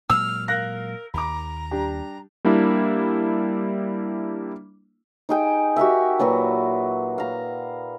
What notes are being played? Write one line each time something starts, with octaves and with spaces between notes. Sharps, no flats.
A#2 F#3 G#3 E6 F6
A#4 F5 F#6 A#6
D#2 A#5 B5 D6
G3 D4 G4
G3 A#3 D4 E4
D#4 G#4 G5
F#4 G4 A#4 E5
A#2 F#3 F#4 B4
F5 A#5